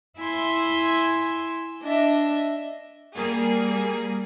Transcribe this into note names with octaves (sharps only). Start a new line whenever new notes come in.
E4 E5 G#5 C6
D4 D#5 E5
G3 A#3 G#4